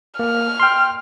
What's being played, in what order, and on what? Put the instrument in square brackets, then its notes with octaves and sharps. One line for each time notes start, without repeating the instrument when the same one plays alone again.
[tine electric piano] A#3 [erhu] F6
[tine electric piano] G5 C6